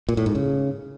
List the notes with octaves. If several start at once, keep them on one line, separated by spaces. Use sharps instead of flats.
A#2
A2
G#2
C#3